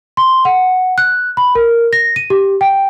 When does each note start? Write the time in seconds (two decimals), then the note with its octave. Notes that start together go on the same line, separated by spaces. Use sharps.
0.17 C6
0.45 F#5
0.98 F#6
1.37 B5
1.55 A#4
1.93 A#6
2.16 D#7
2.30 G4
2.61 G5